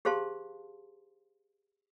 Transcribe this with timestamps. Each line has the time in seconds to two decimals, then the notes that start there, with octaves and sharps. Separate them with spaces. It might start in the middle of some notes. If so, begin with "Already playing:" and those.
0.05 G4 G#4 C5 F5 A5 C6